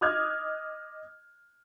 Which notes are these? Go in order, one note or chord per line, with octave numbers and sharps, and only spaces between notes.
D#5 D6 D#6 F6 F#6 G#6